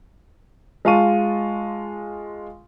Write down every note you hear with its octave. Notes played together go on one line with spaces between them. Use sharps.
G#3 F4 F5 A5 C#6 D#7